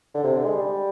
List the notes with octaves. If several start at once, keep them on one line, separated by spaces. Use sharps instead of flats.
D3
C3
D3
G#3
G3